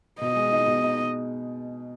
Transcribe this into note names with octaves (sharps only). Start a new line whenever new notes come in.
B2 D#5
G#3
D#4
B2
D#4